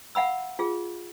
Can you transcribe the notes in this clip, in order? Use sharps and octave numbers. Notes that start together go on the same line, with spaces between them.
F5 F#5 B5 E6
F4 G#4